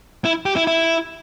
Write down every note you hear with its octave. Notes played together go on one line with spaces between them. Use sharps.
E4
G4
E4
E4